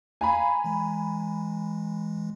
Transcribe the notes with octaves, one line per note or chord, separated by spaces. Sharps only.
F5 G#5 A#5 B5
E3 G#3